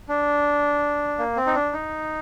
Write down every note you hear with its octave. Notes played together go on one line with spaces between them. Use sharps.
D4
A#3
C4
D#4
D4
D#4